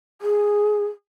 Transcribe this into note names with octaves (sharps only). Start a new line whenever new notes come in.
G#4